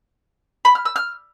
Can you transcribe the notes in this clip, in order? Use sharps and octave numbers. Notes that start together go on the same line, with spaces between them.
B5
F6
E6
F6